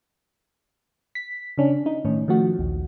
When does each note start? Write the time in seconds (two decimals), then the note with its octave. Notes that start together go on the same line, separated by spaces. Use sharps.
1.15 B6
1.58 C#3 C#4 D4
1.86 D#4
2.05 A2 D#3 C#4
2.28 D#3 F3 A3 F#4
2.59 A#1 D#2